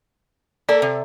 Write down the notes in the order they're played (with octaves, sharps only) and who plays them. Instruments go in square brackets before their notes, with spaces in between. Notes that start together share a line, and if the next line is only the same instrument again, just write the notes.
[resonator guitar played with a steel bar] A#3 A4 [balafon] D5
[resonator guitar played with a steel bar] C3